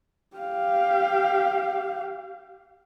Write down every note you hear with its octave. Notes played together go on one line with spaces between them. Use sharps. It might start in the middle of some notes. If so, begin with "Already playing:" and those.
G4 F5